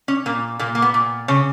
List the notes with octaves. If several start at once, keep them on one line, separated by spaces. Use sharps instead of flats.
C#4
A#2 A#3
A#2 A#3
A#3
B3
A#2
C#3 C#5